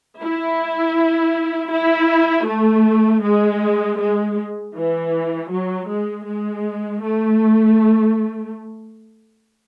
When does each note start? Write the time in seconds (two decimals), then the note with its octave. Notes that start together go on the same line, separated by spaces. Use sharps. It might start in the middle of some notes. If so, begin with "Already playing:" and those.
0.21 E4
1.71 E4
2.47 A3
3.22 G#3
3.98 G#3
4.74 E3
5.50 F#3
5.88 G#3
6.26 G#3
7.01 A3